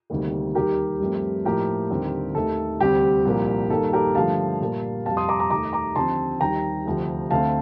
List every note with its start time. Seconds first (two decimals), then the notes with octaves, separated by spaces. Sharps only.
0.10 D2 C3 D#3 G3 A#3
0.55 D#2 D#3 G3 G4 A#4
1.00 G2 F3 A3 C4
1.45 A2 F3 A#3 G4 A#4
1.91 D#2 D3 G3 C4
2.35 D#2 D#3 A3 A4
2.81 D2 C3 G3 C4 G4
3.25 C2 A#2 F3 A#3
3.70 G2 D#3 A#3 A4
3.93 G4 A#4
4.15 G2 D3 F3 A3 F5 A5
4.61 A#2 G3 A#3
5.06 F2 C3 G3 F5 A5
5.17 C6 D#6
5.29 A#5 D6
5.40 A#5 D6
5.50 D#2 D#3 A3 A#5 D6
5.73 A#5 D6
5.96 D#2 D3 F3 C4 A5 C6
6.40 D#2 D#3 G3 C4 G5 A#5
6.86 D2 C3 F3 A3
7.31 D2 D3 A3 C4 F5 A5